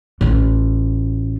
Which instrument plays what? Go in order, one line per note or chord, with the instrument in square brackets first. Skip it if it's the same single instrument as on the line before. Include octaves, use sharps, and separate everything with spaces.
[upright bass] A1 F4